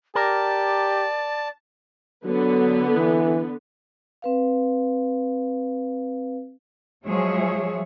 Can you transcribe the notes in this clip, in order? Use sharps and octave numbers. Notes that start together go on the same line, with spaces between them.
G4 A#4 D5 A5
D3 F#3 B3
E3
C4 B4 F5
F3 F#3 G#3 G#4 C#5 E5